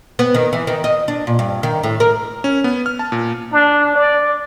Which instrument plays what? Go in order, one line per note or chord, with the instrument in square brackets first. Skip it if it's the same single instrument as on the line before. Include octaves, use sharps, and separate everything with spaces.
[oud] B3
D#3
E3
D#3
D#5
D4
A#2
G2
D#3
A2
A#4
[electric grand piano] C#4
B3
F6
A5
A#2
[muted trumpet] D4
D5